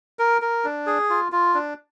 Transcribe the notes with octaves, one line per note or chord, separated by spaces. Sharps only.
A#4
A#4
D4
G#4
F4
F4
D4